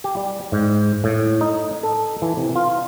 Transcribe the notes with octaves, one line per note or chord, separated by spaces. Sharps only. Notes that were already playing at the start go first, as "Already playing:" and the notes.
G4
G3
G#2
A2
D#4
A4
E3
C3
F4